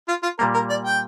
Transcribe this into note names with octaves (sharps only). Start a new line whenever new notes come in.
F4
F4
A#2 G3 A#3 A#4
A#4
D5
G5